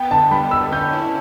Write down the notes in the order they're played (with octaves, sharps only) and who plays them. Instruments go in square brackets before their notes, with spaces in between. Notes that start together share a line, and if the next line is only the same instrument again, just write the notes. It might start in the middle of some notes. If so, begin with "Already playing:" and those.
Already playing: [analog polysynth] B3 [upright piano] G5
[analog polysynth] D3 [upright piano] A5
[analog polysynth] G3 [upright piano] B5
[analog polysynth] D3 [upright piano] E6
[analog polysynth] C#4 [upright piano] G6
[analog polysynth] E4